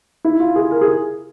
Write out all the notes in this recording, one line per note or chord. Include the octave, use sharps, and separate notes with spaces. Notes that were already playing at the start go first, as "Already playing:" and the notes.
E4
F4
G#4
A#4
G#4